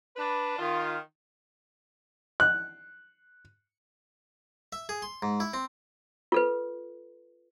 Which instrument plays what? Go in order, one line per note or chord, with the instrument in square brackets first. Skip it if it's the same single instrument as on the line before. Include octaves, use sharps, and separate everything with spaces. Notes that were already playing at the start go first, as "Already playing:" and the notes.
[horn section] D4 B4
D#3 F4
[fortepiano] F#6
[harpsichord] E5
G#4
C6
G#2
E4
C4
[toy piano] F4 A4 B4